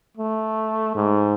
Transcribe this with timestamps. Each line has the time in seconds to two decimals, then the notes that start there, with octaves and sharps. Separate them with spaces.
0.17 A3
0.95 G#2